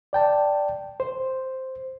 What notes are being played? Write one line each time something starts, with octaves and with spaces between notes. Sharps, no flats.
D5 G5 A5
C5